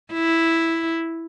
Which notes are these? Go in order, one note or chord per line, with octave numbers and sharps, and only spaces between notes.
E4